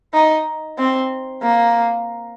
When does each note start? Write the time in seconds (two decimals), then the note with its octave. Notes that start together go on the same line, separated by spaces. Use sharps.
0.14 D#4
0.78 C4
1.43 A#3